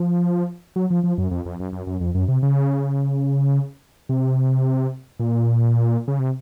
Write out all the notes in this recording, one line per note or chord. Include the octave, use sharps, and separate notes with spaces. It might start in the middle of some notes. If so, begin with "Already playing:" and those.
Already playing: F3
F#3
F3
F3
F#2
F2
F2
F#2
F#2
F#2
F2
F#2
C3
C#3
C3
A#2
C#3
C3